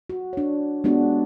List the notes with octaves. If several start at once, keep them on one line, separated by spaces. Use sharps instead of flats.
F#4
D4 C#5
G#3 B3 D4 F#4 G4